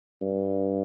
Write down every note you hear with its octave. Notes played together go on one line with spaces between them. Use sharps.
G2